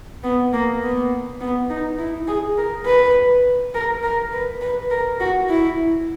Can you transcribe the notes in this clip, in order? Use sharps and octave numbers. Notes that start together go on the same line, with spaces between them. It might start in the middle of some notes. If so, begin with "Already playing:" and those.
B3
A#3
B3
B3
D#4
E4
G#4
A#4
B4
A#4
A#4
B4
B4
A#4
F#4
E4